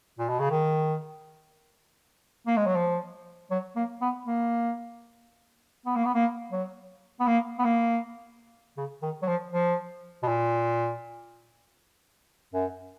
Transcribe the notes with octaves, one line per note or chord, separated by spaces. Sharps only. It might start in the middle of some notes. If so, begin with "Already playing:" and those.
A#2
B2
C#3
D#3
A#3
G#3
F#3
F3
F#3
A#3
B3
A#3
B3
A#3
B3
A#3
F#3
B3
A#3
B3
A#3
C#3
D#3
F#3
F3
F3
B2
A#2
F#2